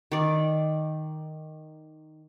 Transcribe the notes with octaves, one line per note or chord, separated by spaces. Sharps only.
D#3 D5